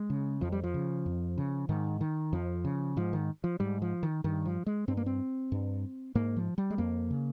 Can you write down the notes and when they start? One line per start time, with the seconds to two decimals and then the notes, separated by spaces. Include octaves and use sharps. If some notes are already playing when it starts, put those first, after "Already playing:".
Already playing: G#3
0.10 C#3
0.41 F2 F3
0.52 G3
0.64 F3
0.74 C#3
1.06 F2
1.38 C#3
1.69 G#2 D#3
2.01 D#3
2.33 F2 F3
2.65 C#3
2.97 G#2 F3
3.13 D#3
3.44 F3
3.60 G#2 G3
3.82 F3
4.03 D#3
4.24 G2 D#3
4.45 F3
4.66 G#3
4.88 G2 C4
4.97 A#3
5.06 C4
5.52 G2
6.15 G#2 A#3
6.37 F3
6.58 G3
6.70 G#3
6.78 F2 A#3
7.11 C#3